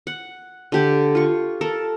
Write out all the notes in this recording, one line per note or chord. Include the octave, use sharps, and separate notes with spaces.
F#5
D3 G4 D6
F4 C#6
A4 A#4